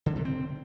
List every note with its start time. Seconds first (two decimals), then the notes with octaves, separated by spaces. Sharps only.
0.06 D3
0.16 C3
0.25 C4